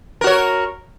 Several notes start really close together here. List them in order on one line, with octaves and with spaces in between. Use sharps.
A#4 F#4 C#5